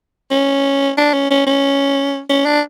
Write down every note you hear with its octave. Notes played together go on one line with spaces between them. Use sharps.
C#4
D4
C#4
C#4
C#4
C#4
D4